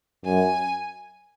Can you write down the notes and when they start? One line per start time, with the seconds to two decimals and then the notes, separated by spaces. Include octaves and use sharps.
0.25 F#2 G#5